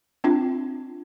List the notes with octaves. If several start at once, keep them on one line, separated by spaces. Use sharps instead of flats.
C4 D4 F4